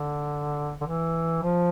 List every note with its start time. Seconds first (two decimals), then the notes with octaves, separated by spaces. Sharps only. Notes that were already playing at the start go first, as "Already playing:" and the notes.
Already playing: D3
0.81 D3
0.86 E3
1.43 F3